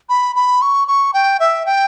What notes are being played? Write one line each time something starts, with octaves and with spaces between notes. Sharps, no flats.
B5
B5
C#6
C#6
G5
E5
G5